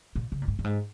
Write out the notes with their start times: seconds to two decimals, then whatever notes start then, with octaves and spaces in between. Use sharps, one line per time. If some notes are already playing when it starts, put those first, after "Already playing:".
0.15 A#2
0.32 C#3
0.42 A#2
0.48 G#2
0.59 G2
0.64 G#2